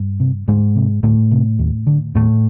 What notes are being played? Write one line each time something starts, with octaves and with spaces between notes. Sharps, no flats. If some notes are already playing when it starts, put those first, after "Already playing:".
Already playing: G2
C3
D2 G#2 G#3
C3
D2 A2 A3
C3
D#2
D3
D#2 A2 A3